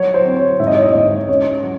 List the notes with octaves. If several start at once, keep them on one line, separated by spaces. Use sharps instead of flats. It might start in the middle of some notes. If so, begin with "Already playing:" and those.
Already playing: F#3 C#5
C5
C4
C#5
G#2 E5
D#5
C#5
D#5
G#2
C#4 C#5
F#3